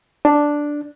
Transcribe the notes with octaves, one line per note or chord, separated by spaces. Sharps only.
D4